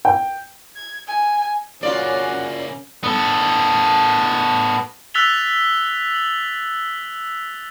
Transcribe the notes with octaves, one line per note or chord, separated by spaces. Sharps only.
G5
G#6
G#5
C#3 A#3 C#4 F4 F#4 D5
B3 A4
E6 F#6 A6 B6 F7 G7
F#7